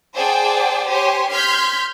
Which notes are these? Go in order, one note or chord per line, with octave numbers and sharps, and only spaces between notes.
G#4 C5 D5 F#5 G5 A5
G4 C5 C#5 G#5 C6
C6 F6 G6 G#6 B6